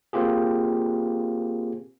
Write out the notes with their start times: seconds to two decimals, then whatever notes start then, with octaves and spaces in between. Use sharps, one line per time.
0.13 A#3 C4 F4 G4 G#4